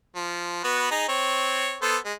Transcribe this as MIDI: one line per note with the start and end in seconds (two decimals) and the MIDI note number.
0.16 0.61 53
0.64 0.90 59
0.64 0.90 66
0.64 0.90 71
0.91 1.04 63
0.91 1.04 68
0.91 1.04 82
1.08 1.77 60
1.08 1.77 73
1.82 1.97 59
1.82 1.97 69
1.82 1.97 72
2.05 2.13 56